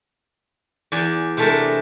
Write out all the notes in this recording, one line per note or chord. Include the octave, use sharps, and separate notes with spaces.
E2 D5 G#5
C3 G#3 A3 D4 A4 A#4